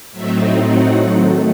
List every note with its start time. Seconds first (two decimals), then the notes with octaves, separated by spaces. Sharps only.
0.12 A2 F#3 A3 C4 D#4 E5
0.63 F#5
1.15 D#3 F#3 A3